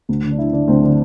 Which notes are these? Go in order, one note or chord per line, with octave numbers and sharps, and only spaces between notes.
D2
D3
D4
D3 E4
D3 D4
D2 C4
D3 D4